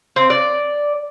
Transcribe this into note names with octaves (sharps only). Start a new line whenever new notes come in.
C4
D5